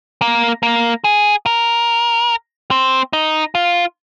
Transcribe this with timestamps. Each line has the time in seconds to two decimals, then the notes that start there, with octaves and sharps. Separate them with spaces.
0.21 A#3
0.63 A#3
1.04 G#4
1.46 A#4
2.71 C4
3.13 D#4
3.55 F4